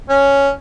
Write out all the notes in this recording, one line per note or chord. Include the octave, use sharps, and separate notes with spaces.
C#4